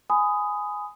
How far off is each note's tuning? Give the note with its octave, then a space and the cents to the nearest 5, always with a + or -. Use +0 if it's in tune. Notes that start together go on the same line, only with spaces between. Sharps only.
G#5 +0 B5 +30 D#6 +0